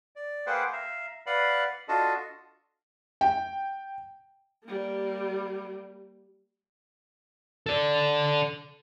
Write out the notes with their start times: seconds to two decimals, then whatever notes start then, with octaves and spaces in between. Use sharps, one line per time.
0.16 D5
0.46 A#3 G#4 B4 C5 F#5 G5
0.73 E5 F5 A#5
1.26 B4 D5 F5 F#5 B5
1.88 D4 F4 F#4 A4 D#5
3.21 G5
4.64 G3 A#3
7.66 A4 D5